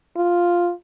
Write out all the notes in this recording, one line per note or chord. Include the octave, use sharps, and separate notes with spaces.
F4